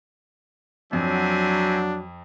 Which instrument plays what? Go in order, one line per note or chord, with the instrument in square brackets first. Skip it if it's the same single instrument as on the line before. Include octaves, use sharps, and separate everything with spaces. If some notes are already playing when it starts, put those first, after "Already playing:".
[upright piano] F2 [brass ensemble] F#3 [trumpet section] C4 E5 G#5 [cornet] D4